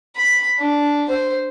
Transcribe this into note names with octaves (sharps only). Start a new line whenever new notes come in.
B5
D4
C5